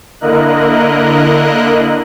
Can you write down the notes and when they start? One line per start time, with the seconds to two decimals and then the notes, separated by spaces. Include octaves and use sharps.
0.21 D3 A#3 E4 A#4 D#5 F#6